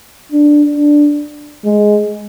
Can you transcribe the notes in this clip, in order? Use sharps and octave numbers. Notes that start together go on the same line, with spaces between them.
D4
D4
G#3